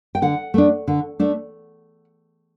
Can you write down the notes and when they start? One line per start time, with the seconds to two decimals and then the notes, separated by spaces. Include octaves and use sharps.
0.15 G5
0.22 D3 F#5
0.54 A3 D4
0.88 D3
1.20 A3 D4